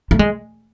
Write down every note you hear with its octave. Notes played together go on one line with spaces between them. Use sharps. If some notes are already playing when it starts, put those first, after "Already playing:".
A3
G#3